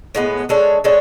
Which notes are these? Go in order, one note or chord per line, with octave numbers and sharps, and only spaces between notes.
A2 G#3 B3
G#3 D4 A4 C#5
G#3 D4 A4 C#5